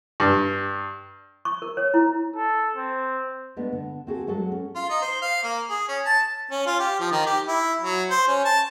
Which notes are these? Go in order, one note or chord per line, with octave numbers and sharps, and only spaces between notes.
G2
C#6
A#4
C#5
E4
A4
C4
G#3 A3 B3 D4
D3
C4 F#4 G#4 A4
F#3 G#3 F#4 G#4 A4
C#4
F4
D#4
C5
F5
A#3
G#4
C#4
A5
C#4
F4
G4
F3
D#3
G4
E4
F#3
C5
C#4
A5